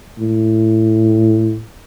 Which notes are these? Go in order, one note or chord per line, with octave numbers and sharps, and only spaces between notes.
A2